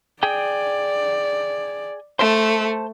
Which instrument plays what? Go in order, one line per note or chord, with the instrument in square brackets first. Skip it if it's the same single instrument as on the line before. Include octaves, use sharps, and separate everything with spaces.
[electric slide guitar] G#4 G5 [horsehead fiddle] D5
[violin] A3 [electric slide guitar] C5 A5